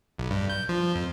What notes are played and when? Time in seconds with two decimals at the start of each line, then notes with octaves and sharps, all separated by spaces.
0.18 B1
0.30 G2
0.50 G6
0.69 F3
0.95 F2